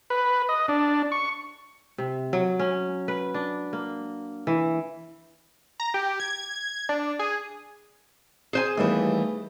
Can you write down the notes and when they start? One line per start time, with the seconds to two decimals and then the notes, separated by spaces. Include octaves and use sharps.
0.10 B4
0.49 D#5
0.68 D4
1.12 C#6
1.98 C3
2.33 F#3
2.59 C#4
3.08 B4
3.34 D4
3.73 A#3
4.47 E3
5.80 A#5
5.94 G4
6.20 G#6
6.89 D4
7.19 G#4
8.53 G#4 C5 G#5
8.78 D#2 E3 G3 A3 B3